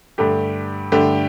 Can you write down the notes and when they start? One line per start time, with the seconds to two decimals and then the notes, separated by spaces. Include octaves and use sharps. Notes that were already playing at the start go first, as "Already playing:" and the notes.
0.18 G2 D3 A3 G4
0.92 G2 D3 A3 G4